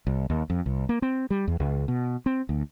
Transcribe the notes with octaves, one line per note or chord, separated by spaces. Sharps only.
C2
D#2
F2
C2
A#3
C4
G3
E2
C#2
B2
C4
D2